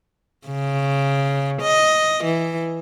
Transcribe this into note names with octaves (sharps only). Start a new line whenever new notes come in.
C#3
D#5
E3